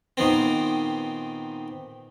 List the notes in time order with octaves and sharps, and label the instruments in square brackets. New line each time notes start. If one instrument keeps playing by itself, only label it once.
[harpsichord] A#2 D#3 B3 C4